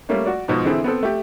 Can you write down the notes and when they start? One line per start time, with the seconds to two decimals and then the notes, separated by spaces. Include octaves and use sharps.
0.09 G3 A3 A#3 C#4
0.25 F#4 D5
0.48 G#2 B2 F3 D#4
0.65 D3 E3 C4 E4 G#4 A4
0.84 B3 C4 A4
1.03 A3 G4